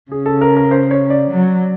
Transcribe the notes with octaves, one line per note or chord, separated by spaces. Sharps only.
C#3 G#4
A4
A#4
A#4
C5
C#5
D5
F#3